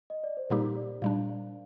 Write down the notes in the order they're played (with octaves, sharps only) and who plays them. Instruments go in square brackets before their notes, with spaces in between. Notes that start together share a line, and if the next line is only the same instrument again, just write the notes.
[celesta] D#5
D5
C5
[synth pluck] A#2 G3 A#3 D#4 G4 [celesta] A#4
[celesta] D5
[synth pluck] A#2 G3 D4 [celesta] F5
[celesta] F5